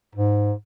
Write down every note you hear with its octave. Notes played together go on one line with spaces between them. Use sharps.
G#2